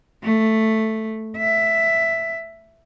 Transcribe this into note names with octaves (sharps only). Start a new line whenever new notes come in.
A3
E5